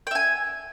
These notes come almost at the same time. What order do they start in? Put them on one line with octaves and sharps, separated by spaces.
G5 E5 G#5